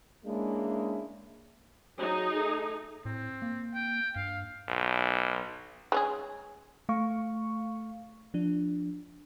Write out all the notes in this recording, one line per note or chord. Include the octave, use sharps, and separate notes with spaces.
G#3 A#3 C#4 D4 E4
F#3 D#4 G#4
A3
A2 C4
A#3
G5
G2 F5
B1
G#3 C#4 G#4
A3 F5 C#6
F3 D4